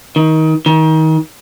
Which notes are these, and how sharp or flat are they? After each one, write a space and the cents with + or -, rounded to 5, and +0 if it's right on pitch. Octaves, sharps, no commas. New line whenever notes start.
D#3 +25
D#3 +30